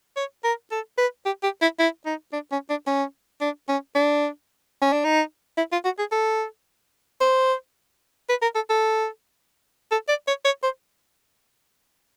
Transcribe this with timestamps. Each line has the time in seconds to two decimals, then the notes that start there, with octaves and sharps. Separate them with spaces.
0.16 C#5
0.44 A#4
0.72 A4
0.98 B4
1.26 G4
1.43 G4
1.62 E4
1.79 E4
2.06 D#4
2.33 D4
2.52 C#4
2.70 D4
2.87 C#4
3.41 D4
3.69 C#4
3.95 D4
4.82 C#4
4.93 D4
5.05 D#4
5.58 E4
5.72 F4
5.85 F#4
5.99 G#4
6.12 A4
7.21 C5
8.29 B4
8.42 A#4
8.55 A4
8.70 A4
9.91 A4
10.09 D5
10.28 C#5
10.45 C#5
10.63 C5